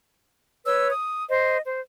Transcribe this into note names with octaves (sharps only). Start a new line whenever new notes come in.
B4 C#5 E6
D#6
C5 D#5
C5